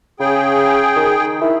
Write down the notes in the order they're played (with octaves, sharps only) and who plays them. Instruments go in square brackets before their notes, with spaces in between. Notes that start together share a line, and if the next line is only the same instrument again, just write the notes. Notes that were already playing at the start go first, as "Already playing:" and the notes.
[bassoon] C#3 [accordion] G#4 G5
[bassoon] D#3
E4